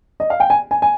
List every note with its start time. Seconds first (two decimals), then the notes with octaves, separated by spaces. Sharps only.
0.20 D#5
0.30 F5
0.40 G5
0.50 G#5
0.71 G#5
0.82 G#5